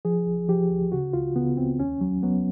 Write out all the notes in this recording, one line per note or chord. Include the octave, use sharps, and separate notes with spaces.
F3 G#4
D2
F3 G4
D2
C#3 F#4
C#2 F4
C#3 B3
C#2 C4
D#2 C#4
F#3
F#3 B3